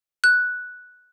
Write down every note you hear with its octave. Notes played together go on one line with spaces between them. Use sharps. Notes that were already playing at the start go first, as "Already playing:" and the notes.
F#6